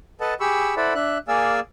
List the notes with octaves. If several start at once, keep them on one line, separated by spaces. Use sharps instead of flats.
A4 B4 D#5 F#5 A5
G4 G#4 B5 C#6 E6
E4 A4 C5 D5 F#5 B5
D4 E5 F#6
A#3 G#4 D5 F5 G#5 E6